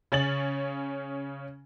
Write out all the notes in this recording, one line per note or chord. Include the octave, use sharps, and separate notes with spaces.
C#3 C#4 A6 F#7